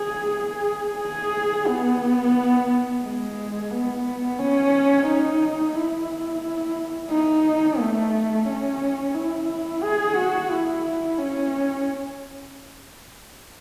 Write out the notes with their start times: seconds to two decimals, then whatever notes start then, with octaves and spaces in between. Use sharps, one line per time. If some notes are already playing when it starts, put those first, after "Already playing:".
Already playing: G#4
0.31 G#4
0.99 G#4
1.67 B3
3.03 G#3
3.72 B3
4.39 C#4
5.06 D#4
5.75 E4
7.10 D#4
7.79 A3
8.47 C#4
9.15 E4
9.83 G#4
10.17 F#4
10.50 E4
11.19 C#4